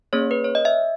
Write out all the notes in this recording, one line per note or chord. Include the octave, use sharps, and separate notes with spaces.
A#3 C#4 G#4 C#5
B4
C#5
D#5
E5